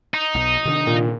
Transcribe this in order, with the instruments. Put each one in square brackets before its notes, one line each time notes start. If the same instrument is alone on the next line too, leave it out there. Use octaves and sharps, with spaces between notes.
[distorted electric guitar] D#4
[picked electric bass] B1
C3 D#3 D4
[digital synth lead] A#2